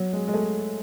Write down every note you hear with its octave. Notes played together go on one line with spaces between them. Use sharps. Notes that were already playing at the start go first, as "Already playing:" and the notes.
Already playing: F#3
G#3
G#3
A3